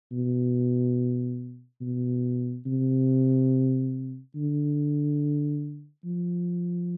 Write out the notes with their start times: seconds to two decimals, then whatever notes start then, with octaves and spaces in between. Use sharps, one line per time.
0.12 B2
1.81 B2
2.66 C3
4.35 D3
6.05 F3